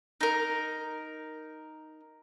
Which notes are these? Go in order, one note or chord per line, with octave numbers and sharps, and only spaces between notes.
D#4 A#4